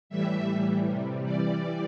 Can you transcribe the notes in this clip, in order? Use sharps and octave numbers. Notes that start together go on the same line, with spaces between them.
A2 E3 G3 E5
A2 E3 G3
C3 G3
E3 G3 D5